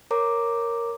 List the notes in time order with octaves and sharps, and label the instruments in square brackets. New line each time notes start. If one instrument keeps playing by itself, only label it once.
[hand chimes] A#4 C#5 A#5 D6